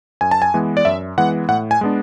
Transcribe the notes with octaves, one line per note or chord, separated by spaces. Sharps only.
F#2 G#5
A5
G#5
E3 G#3 B3
D5
F#2 E5
E3 G#3 B3 F#5
A2 F#5
G#5
G#3 B3 D4